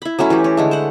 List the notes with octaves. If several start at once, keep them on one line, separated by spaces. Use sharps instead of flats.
E4 B5
F#3 A3 C#4 E4
E3 G4
C#4
D3 G#3 A3
C5 F#5